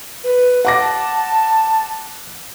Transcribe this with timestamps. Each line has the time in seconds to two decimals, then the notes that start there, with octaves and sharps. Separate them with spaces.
0.24 B4
0.65 F#5 D6 A#6
0.80 A5